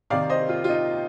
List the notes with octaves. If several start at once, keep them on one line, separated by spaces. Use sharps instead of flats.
C3 D#3 D5 F5
C5 D#5
F4
F4
D#4